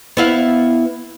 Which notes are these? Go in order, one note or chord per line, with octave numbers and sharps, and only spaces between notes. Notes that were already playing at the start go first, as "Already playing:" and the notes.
B3 E4 F5